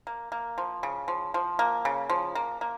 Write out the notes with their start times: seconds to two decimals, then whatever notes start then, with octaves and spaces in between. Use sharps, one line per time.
0.07 A#3
0.32 A#3
0.58 F3
0.83 C#3
1.08 F3
1.34 F3
1.59 A#3
1.85 C#3
2.10 F3
2.35 A#3
2.61 A#3